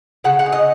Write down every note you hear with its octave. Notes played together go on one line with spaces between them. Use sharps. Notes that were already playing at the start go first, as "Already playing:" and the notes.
C#3 F#5
F#5
D#4
D#5